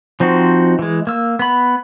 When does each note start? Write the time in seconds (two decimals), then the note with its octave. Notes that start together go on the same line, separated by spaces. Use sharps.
0.20 F3 C4 D#4 F#4
0.79 E3 G#3
1.07 A#3 E6
1.39 B3 B5